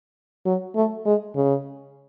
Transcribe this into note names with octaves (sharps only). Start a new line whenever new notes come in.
F#3
A3
G#3
C#3